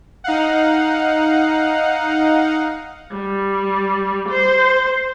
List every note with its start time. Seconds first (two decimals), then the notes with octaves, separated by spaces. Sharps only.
0.24 D#4 F5 F#5
3.12 G3
4.29 C5